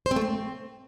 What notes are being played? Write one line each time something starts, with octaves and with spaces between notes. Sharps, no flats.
C5
C4
A3
C4